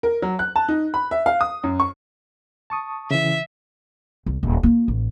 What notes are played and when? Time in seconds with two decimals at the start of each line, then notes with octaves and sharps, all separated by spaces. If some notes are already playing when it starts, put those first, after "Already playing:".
0.03 A#4
0.22 F#3
0.39 F#6
0.56 A5
0.68 D#4
0.94 B5
1.11 E5
1.26 F5
1.41 D#6
1.63 F#2
1.80 C#6
2.70 A5 C#6 D#6
3.11 C#3 E3 E5
4.26 C2
4.43 D#1
4.63 A#3 F4
4.88 A1